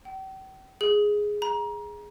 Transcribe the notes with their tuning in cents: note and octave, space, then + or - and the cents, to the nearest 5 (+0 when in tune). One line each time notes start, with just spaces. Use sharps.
G5 -40
G#4 +0
A#5 +25